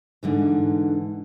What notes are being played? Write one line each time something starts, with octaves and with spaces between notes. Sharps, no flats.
G#2 D3 E3